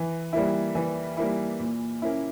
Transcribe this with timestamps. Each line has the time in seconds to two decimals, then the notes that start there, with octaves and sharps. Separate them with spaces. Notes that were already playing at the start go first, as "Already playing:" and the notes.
Already playing: E3
0.33 G3 A#3 E4
0.75 E3
1.17 G3 A#3 E4
1.59 A#2
2.02 A#3 C#4 E4